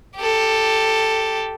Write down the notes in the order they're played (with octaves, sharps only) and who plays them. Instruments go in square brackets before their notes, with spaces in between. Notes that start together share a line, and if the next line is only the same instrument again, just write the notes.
[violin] G4 A4